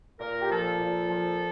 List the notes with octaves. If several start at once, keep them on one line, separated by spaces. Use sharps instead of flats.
A#2 A#4
G4
F3 A4
A#2
F3